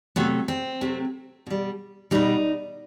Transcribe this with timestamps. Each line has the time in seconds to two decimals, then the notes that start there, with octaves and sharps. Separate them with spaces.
0.16 C3 F#3 A3 B3
0.48 C4
0.81 C3 F#3 A3
1.47 B2 G3
2.11 B2 G3 D#4